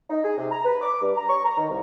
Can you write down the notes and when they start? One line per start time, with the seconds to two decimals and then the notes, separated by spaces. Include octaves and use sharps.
0.10 D#4
0.24 G#4
0.38 C3
0.51 A#5
0.65 B4
0.81 D6
1.01 G2
1.16 A#5
1.29 C#6
1.45 A#5
1.57 D#3
1.69 C2